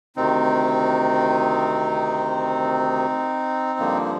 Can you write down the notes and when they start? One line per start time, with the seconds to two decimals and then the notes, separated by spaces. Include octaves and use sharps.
0.16 D2 C3 D#3 C4 D#4
3.79 G2 D3 F3 A#3